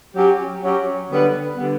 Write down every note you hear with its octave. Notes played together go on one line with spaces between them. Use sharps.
F#3 C#4 G4
F#3 C#4 G4
D3 G3 B3
D3 G3 B3